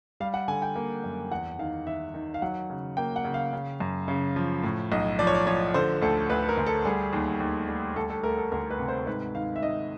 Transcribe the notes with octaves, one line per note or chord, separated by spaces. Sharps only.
G3 F5
F#5
D3 G#5
G5
A#3
F#2
E2 F#5
D#3 F5
D#3 E5
D#3
F5
F#3 F#5
C#3
A#3 G5
F#5
C#3
F5
C#3
F#2
C#3
F3
A2
B1 D#5
F3 D5
C#5
D5
F3 C#5
D3 C5
D2 A4
D2 B4
A#4
D2
A4
G3 G#4
D#2
D#2
G3
D2 A4
A4
A3 A#4
A4
D2 A#4
B4
C3
C5
G#2 B4
D#3 F5
E5
D#3 D#5